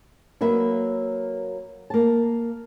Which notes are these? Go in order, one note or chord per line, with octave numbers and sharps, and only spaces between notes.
F#3 A#3 B4 E5
A#3 A5